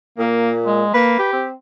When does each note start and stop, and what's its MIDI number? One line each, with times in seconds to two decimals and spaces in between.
0.18 0.83 46
0.18 0.52 58
0.67 0.91 56
0.94 1.19 58
0.94 1.29 71
1.19 1.45 67
1.33 1.53 60